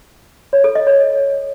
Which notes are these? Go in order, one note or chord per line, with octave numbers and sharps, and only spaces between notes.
C#5
A4
D#5
C#5